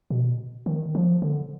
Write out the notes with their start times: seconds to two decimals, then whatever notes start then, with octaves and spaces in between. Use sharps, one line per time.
0.10 B2
0.66 D#3
0.95 F3
1.22 D3